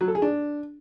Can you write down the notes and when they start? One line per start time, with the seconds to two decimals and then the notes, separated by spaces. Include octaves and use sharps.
0.01 F#3
0.08 A4
0.15 G#4
0.22 D4